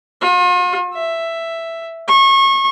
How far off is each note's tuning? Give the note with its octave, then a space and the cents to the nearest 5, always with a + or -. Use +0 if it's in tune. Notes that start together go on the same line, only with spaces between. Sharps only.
F4 +45
E5 +5
C#6 -30